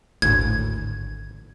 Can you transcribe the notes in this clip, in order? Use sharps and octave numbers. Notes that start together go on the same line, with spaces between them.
G#1 D2 A2 G#6